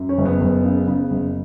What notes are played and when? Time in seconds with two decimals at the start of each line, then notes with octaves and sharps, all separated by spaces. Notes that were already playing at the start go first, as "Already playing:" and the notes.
Already playing: F#2
0.09 C#4
0.18 F#1
0.25 B3
0.41 F#1
0.64 C#3
0.87 C#3
1.11 F#1